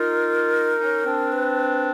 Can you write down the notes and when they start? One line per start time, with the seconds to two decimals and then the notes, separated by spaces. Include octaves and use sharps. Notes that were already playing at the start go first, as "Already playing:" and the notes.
Already playing: D#4 F4 A#4
0.78 C#4 D#4
1.05 C4 D4
1.32 B4